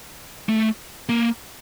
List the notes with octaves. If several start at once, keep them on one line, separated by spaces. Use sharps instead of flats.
A3
A#3